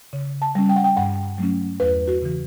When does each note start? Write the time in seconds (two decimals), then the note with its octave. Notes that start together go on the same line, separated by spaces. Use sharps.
0.13 C#3
0.42 A5
0.55 G3 C#4
0.69 G5
0.76 F#5
0.84 G5
0.97 G2 F#5
1.38 F#3 A3 C#4
1.80 E2 B4
2.08 F#4
2.22 C#3 E3